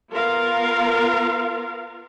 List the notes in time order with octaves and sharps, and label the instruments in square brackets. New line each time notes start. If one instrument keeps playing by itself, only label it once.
[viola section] B3 F4 A#4 F5